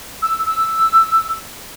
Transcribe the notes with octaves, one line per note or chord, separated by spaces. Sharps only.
E6
E6